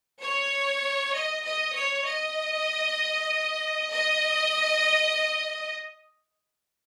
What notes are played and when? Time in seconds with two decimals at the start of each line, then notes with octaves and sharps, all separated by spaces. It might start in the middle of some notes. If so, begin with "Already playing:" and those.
0.20 C#5
1.13 D#5
1.43 D#5
1.75 C#5
2.05 D#5
3.91 D#5